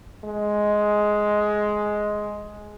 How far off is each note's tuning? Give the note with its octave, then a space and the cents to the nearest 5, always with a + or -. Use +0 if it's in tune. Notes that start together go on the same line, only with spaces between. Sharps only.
G#3 +10